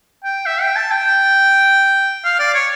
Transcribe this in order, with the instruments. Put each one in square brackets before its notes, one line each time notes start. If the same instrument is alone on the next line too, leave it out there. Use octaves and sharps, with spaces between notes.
[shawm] G5
E5
G5
A5
G5
F5
D5
C#5